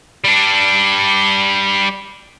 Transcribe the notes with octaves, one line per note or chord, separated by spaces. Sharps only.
G3 D4